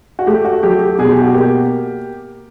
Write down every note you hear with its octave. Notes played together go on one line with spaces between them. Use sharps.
F#4
A3 G4
F#4
F#3 G4
G4
B2 G#4
G4
F#4
A#3 G4